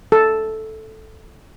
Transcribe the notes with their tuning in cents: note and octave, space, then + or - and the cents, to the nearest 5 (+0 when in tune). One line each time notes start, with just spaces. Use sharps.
A4 -5